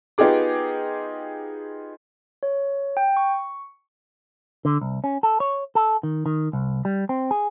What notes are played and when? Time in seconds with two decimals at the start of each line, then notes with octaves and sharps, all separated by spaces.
0.18 B3 D#4 F4 G4 G#4 D6
2.43 C#5
2.97 G5
3.17 C#6
4.65 D3
4.81 C2
5.04 C#4
5.23 A4
5.40 C#5
5.75 A4
6.03 D#3
6.26 D#3
6.53 C2
6.85 G3
7.09 C4
7.31 G#4